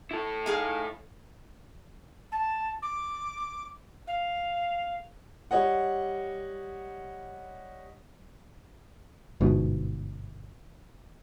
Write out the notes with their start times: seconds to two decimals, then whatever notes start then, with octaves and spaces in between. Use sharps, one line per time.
0.11 E4 A4
0.46 D#4 G#4 F5
2.31 A5
2.82 D6
4.07 F5
5.51 G3 C#5 D#5 F#5
9.41 G1 G#2 B2